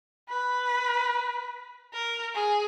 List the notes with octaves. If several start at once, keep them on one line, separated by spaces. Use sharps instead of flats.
B4
A#4
G#4